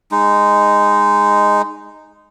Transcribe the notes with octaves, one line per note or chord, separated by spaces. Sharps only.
G#3 D#4